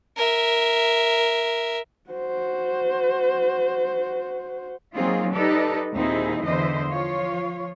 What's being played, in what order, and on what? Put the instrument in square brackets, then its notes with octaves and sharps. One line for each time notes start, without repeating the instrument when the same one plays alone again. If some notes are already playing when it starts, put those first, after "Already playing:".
[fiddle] A#4 E5
[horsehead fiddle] F#4 C5
[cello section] F#3 A#3 C4 D#4 F4 G#4
D#4 G4 A4 B4 D5
D#2 A#2 C4 D#4 E4 G#4
E2 D3 E3 E4 C5 D#5
F3 F4 C#5